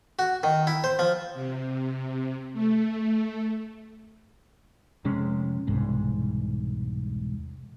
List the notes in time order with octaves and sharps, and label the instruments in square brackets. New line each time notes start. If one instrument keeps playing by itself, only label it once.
[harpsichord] F#4
D#3
E4
C5
F3
[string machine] C3
A3
[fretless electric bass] F1 C3 G#3 C#4
E1 C2 G#2